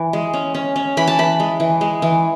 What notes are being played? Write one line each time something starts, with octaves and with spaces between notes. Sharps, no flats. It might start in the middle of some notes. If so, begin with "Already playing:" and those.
Already playing: E3
G#3
C#4
C#4
C#4
E3 B5
A5
E3 B5
G#3
E3
G#3
E3